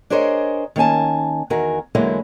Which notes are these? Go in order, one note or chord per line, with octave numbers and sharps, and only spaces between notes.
D4 G#4 A#4 C5 C#5 D#5
D#3 A#3 C#4 G#5 A5
E2 D#3 F#4 A#4 G#5
E2 D3 F#3 G#3 A#3 E4